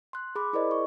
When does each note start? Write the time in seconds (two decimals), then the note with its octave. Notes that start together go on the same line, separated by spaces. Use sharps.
0.13 C6 F#6
0.35 G#4 B5 D6
0.53 E4 G#4 A#4 C5 D5 D#5
0.71 C#6